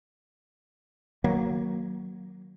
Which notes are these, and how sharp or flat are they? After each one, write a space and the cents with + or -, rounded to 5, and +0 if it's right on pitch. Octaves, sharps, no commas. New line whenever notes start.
D#3 +0 F#3 +0 A#3 +0